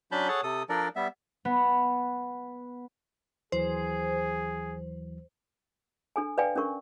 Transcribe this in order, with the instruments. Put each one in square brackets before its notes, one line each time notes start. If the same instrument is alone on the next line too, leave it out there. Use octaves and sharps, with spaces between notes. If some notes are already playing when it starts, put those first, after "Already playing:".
[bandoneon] F#3 C#4 D4 A5 B5 G6
G#4 A4 C#5 F#5 A5
C3 A4 D#6
F3 D4 A4 A#4 D5
G3 B3 E5
[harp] B3
[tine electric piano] D#2 E3 F#3 [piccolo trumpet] G#4 [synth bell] C5
[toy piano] D4 A4 G#5
B4 D5 F5 G5 G#5
C#4 D4 A#4 C#6